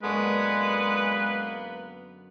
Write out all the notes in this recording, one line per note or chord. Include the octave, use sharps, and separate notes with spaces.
F#2 D3 G#3 A#3 B3 B4 C#6